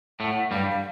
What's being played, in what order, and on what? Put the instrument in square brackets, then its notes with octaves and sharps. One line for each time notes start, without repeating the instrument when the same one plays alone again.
[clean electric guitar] A2 A3 [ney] F#5
[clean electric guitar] G2 G3 [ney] F5
[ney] F5